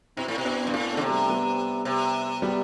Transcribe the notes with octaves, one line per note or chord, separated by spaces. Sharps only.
B2 C4 E4
A2
B2
B3 D4
G2 C4
A2 B3 D4
A3 C4
D3
C3
G3
G3 B3
C3
G3 B3